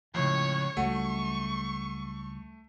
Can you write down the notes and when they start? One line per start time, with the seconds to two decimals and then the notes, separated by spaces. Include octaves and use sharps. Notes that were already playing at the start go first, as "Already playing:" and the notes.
0.15 C#2 A2 C#3 F3 C#5 C#6
0.77 C#2 F#3 G3 A3 F#4 C#6